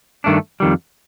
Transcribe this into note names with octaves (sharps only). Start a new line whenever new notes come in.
G2 D#3 A3 D4
F2 D#3 G3